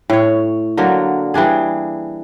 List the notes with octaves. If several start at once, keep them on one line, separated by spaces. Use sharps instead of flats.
A2 C#5
D3 F#3 A#3
E3 G3 D4 G#4